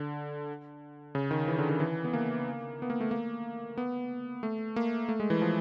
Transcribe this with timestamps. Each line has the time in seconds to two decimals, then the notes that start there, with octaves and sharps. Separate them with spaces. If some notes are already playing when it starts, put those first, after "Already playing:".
Already playing: D3
1.15 C#3
1.31 D#3
1.48 E3
1.58 D3
1.69 D#3
1.80 E3
2.05 B3
2.13 A#3
2.82 B3
2.90 A#3
3.01 A3
3.11 A#3
3.77 B3
4.43 A3
4.76 A#3
5.09 A3
5.20 G#3
5.30 E3
5.41 F3